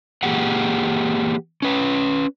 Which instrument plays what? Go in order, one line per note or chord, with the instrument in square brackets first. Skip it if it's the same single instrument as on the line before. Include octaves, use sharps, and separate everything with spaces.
[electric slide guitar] E3 A#3 G4 G#4 F#5
C#4 B4